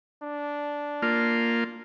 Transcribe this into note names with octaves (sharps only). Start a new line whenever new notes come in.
D4
A#3 F4